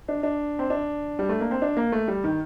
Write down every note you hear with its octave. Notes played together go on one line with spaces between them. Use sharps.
D4
D4
C4
D4
G3
A3
A#3
C4
D4
A#3
A3
G3
D#3